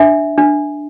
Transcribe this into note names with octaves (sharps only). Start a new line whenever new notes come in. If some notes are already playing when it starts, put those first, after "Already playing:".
Already playing: D4 E5
D4